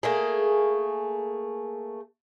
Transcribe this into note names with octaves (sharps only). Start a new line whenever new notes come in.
A3 A#3 G#4